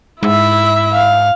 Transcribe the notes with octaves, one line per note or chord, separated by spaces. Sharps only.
G#2 E4 E5
F5